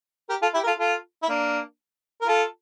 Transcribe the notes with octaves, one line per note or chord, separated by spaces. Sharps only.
G4 A#4
F4 A4
E4 G4
A#4
F4 A4
F4 A4
E4
A#3 D4
A#4
F4 A4